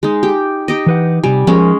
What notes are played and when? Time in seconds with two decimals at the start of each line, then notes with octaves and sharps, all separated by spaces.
0.03 G#3 D#4
0.23 G4
0.68 D#4 G4 D#5
0.87 E3 B4 F#5
1.24 C3 G3 G#5
1.47 F3 G#3 C#4 A#4